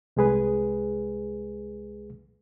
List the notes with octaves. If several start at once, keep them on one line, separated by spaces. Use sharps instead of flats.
C2 G#3 G#4 B4